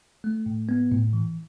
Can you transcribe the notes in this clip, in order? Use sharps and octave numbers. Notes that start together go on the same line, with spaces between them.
A3
A2
B3
A2
E3